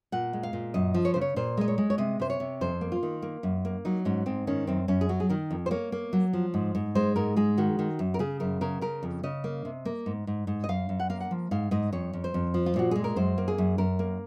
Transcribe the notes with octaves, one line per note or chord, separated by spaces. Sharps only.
A#2 F#5
G#3
F5
A#2
F#2 D#5
F3
C#5
C#3 C5
C#5
A#2 C5
G#3 D#5
C#5
G#3
C#5
C3 D#5
C3 C5
C#5
C3
F2 C5
A#3
F4
D#3
A#3
F#2
A#3
F#3 D#4
G#2 C#4
G#2 C4
D#3 C#4
F#2 C4
F#2 C#4
G#4
F#3 F#4
G#4
D#3 A#4
F2
C5
A#3 C#5
A#3
F#3
F3
G#2
G#2
G#3 C5
G#2 A#4
G#3 G#4
D#3 F#4
D#3
F#2
A#4
C#3 G#4
F#2 A#4
C#3 A#4
C#3 A#4
F2
C#3 D#5
A#3
C3
A#3
G#2
G#2
G#2
D#5
F#2 F5
F#2
F#5
A#3 F5
F#5
F3
G#2 F5
G#2 D#5
F2 C#5
F2
C5
F2
F3
F4
A#2 F#4
G#3 G#4
A#4
F#2 C5
A#3
G#4
F#2
F#2 A#4
A#3